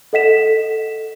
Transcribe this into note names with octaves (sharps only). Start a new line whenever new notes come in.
A4 D#5 F#5 B6 E7